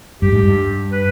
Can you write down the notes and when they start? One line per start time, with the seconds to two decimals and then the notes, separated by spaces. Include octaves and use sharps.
0.22 G2 G4
0.33 G#2
0.43 G2
0.92 B4